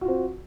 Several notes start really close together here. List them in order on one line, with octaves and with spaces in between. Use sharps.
F#4 F4 C4